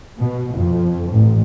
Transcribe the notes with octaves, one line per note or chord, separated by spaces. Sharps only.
B2
F2
A1